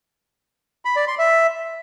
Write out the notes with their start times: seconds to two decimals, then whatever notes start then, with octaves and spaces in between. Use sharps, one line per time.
0.85 B5
0.96 D5
1.07 C6
1.19 E5